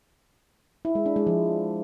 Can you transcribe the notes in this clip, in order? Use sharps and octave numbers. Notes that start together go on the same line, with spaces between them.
E4
G#3
D4
G#3
F3